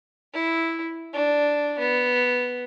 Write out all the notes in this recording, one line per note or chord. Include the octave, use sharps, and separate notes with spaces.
E4
D4
B3